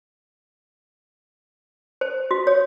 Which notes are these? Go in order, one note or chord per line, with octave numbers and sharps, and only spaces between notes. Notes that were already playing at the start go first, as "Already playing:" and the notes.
C5
F#4
C#5